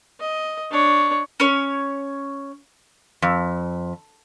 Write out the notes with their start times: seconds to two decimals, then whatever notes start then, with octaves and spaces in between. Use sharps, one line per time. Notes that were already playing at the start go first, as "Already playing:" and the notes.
0.20 D#5
0.71 D4 C#5
1.40 C#4 C#5
3.22 F2